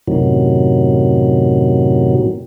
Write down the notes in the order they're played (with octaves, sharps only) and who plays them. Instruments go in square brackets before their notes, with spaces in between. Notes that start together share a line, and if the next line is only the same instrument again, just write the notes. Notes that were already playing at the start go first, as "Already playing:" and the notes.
[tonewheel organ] F#2 A2 C3 D#3 F#3